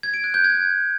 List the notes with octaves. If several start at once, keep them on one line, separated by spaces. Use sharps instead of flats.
G#6
D7
F#6
G6
G#6